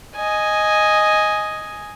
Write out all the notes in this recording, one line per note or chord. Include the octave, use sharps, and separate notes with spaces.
D#5 G#5